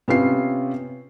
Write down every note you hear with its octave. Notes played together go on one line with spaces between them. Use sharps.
C3 B3 C#4 F4 C7